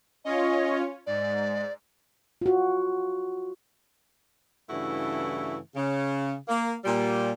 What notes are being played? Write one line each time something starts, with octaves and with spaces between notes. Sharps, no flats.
C#4 F4 C#5 D#5
G#2 D5
F4 F#4
G2 C#3 E3 A3 E4 F#4
C#3
A#3
A#2 G3